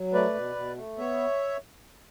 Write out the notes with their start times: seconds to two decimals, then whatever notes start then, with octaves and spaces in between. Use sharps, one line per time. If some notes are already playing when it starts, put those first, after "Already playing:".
Already playing: F#3
0.13 A3 B4 D5
0.34 B2
0.56 B2
0.76 A3
0.98 B3 C#5 E5